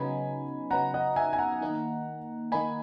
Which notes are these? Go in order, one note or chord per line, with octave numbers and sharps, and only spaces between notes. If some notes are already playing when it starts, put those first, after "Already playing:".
Already playing: C#3 F#3 B3 D#4 G#5 B5
C#3 F#3 B3 D#4 F#5 A#5
D#5 F#5
E5 G#5
G#5
F#5 A#5
D#3 A#3 D#4
D#3 A#3 D#4 G#5 B5